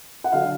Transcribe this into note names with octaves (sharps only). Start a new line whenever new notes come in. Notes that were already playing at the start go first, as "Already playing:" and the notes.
F#5
D3 F#3 F5